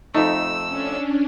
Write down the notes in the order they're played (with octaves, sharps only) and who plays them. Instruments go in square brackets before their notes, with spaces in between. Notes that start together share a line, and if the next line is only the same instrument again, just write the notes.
[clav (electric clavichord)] F2 A3 [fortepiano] D#4 [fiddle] E6
[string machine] C#4 D4